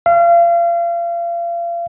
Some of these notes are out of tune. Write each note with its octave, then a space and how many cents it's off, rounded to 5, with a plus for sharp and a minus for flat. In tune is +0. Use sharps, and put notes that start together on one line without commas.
F5 -35